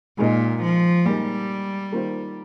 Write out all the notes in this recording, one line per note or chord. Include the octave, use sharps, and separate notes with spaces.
A#2 G#3 D#4 A#4 D#5
F3
A#2 G3 G#3 D#4 A#4
D#3 A#3 F4 C5